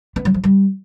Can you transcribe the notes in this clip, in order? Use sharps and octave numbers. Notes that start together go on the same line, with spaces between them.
B3
F#3
F3
G3